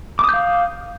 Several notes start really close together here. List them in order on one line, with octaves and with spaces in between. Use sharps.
D6 D#6 G6 F5